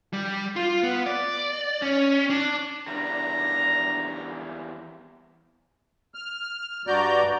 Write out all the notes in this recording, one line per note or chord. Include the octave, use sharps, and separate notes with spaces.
G3
F4
B3
D5
C#4
D4
E2 G3 D4 A#5
F6
G2 F#4 D5 A#5 G6